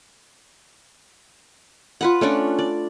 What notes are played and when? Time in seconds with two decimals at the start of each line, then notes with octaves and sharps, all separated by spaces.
2.01 F4 B4 F#5
2.21 A3 C#4 D4 D5
2.59 D5